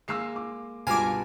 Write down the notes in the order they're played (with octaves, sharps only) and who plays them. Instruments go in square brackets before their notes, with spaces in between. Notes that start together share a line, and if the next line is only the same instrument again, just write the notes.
[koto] G#3 A#3 [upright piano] E6 C7
[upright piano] D6
[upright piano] C#2 G2 [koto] B2 F4 A#4 [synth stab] G#5 D6